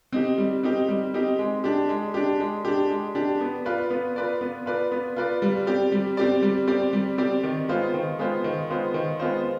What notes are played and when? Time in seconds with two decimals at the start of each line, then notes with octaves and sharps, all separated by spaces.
0.13 C4 D#4 G4
0.38 G3
0.63 C4 D#4 G4
0.88 G3
1.14 C4 D#4 G4
1.39 G#3
1.64 D4 G4
1.89 G#3
2.14 D4 G4
2.40 G#3
2.65 D4 G4
2.90 G#3
3.15 D4 G4
3.41 B3
3.65 F4 B4 D5
3.90 B3
4.16 F4 B4 D5
4.41 B3
4.66 F4 B4 D5
4.92 B3
5.16 F4 B4 D5
5.42 G3
5.67 C4 G4 D5
5.92 G3
6.17 C4 G4 D5
6.42 G3
6.67 C4 G4 D5
6.93 G3
7.18 C4 G4 D5
7.43 D#3
7.69 G#3 B3 F4 C5
7.94 D#3
8.19 G#3 B3 F4 C5
8.44 D#3
8.69 G#3 B3 F4 C5
8.94 D#3
9.19 G#3 B3 F4 C5